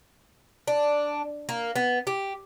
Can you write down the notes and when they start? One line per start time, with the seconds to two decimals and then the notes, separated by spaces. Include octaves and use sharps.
0.68 D4
1.49 A#3
1.76 B3
2.07 G4